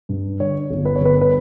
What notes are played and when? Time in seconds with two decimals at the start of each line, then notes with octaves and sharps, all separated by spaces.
0.09 G2
0.40 D3 C#5
0.70 G1
0.85 B4
0.95 C#5
1.01 G1 B4
1.21 B4